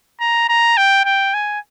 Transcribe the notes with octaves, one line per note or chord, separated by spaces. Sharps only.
A#5
A#5
G5
G5
G#5